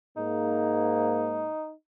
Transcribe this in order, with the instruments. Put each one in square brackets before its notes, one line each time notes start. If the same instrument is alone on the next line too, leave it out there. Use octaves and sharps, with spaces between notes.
[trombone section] G#2 A#3 [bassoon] D#4